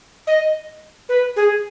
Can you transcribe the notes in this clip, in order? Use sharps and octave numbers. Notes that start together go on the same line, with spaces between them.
D#5
B4
G#4